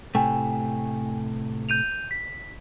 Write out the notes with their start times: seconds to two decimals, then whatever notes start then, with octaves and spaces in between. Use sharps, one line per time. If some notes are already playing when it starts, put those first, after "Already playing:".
0.15 A2 C3 A3 G5 G#5
1.69 G6 D#7 F7
2.11 B6